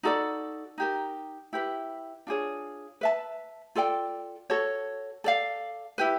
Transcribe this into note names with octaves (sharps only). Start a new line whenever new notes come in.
D#4 F#4 A4 D5
D#4 G4 A#4
E4 G4 B4
D4 F4 G#4 C#5
B4 E5 A5
F4 A4 D5 G5
F#4 A4 C#5
A4 D5 F5
E4 G4 B4